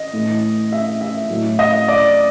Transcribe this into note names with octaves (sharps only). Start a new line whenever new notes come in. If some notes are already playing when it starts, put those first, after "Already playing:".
Already playing: D#5
A2 E3
E5
E5
A2 F#3
D#5
D5